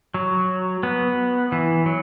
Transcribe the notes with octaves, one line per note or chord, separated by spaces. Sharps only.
F#3
B3
E3
F#3